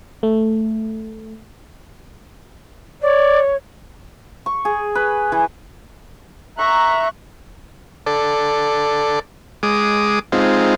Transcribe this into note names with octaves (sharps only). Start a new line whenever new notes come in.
A3
C#5 D5
C#6
G#4
B4
E3
E5 A#5 C#6 F#6
A4 D5
G#3 D6 D#6
G#3 C4 D#4 F4